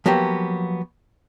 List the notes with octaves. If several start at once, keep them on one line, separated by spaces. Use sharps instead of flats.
F3 F#3 A#3 B3 G4